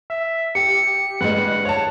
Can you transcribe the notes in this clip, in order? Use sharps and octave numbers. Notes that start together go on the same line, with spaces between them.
E5
G4 C#7
G2 G#3 F#5
C#5 A5